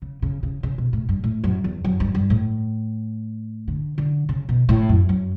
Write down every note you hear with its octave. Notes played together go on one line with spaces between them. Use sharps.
C#3
C#3
C#3
C#3
B2
A2
G2
A2
F#2
E2
F#2
G2
G2
A2
D3
D3
C#3
B2
A2
F#2
F#2